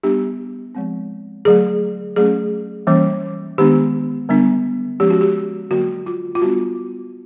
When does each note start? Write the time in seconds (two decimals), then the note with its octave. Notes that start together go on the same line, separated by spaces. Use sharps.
0.03 G3 B3 D4 G4
0.75 F3 G#3 C4
1.45 D3 F#3 A3 G#4
2.16 F#3 A3 C#4 G#4
2.87 E3 G3 A#3 C#4
3.58 D#3 G#3 B3 D4 G4
4.29 D3 G3 B3 D4
5.00 F3 G#3 C#4 G4
5.10 F#4
5.21 G4
5.71 D3 F#3 A#3 F#4
6.06 F4
6.35 F4
6.41 G3 B3 D4 F#4